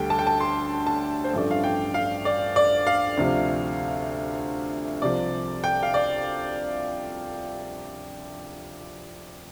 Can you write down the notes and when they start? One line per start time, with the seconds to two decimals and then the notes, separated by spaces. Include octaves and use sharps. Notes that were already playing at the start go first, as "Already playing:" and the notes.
Already playing: D2 D3 G3 D4 G5
0.10 A5
0.19 G5
0.27 A5
0.40 C6
0.87 A5
1.24 C5
1.33 A1 G2 F3 A3 D4 D5
1.51 F5
1.64 G5
1.94 F5
2.25 D5
2.56 D5
2.87 F5
3.17 D2 C3 F3
5.02 C2 C3 F3 D5
5.64 G5
5.83 F5
5.94 D5